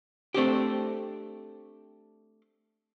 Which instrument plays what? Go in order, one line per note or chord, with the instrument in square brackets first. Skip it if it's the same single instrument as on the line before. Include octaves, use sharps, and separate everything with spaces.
[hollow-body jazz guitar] A3 C4 D4 G4